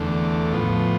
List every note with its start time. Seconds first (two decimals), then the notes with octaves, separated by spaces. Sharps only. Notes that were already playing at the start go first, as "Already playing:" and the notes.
Already playing: E2 D3 A3
0.52 A2 F3 B3